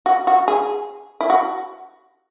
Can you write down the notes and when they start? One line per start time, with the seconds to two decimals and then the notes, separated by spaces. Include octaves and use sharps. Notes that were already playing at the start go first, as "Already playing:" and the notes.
0.06 F#4
0.27 F#4
0.48 G#4
1.21 E4
1.30 F#4